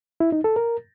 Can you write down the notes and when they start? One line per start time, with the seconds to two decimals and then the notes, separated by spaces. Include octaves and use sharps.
0.20 E4
0.32 D#4
0.44 A4
0.56 A#4